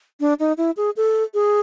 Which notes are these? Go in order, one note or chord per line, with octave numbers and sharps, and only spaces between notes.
D4
D#4
E4
G#4
A4
G#4